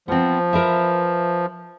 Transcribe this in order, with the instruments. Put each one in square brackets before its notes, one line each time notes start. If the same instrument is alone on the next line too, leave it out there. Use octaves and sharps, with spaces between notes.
[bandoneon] F3 [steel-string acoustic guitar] B3 C4
[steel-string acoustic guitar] A#4 B4 E5